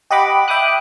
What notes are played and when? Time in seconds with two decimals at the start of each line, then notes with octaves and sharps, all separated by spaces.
0.11 G4 D#5 F#5 B5 D6
0.48 E5 G5 D6 D#6 F#6